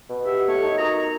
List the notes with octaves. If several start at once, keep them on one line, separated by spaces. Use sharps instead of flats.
B2
G4 E5 F#5
A3 B3 C#5
D#4
F#4 A#4 A#5 D#6
A#5